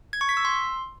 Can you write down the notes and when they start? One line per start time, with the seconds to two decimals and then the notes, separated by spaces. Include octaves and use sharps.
0.13 G#6
0.21 C#6
0.29 B6
0.37 E6
0.45 C6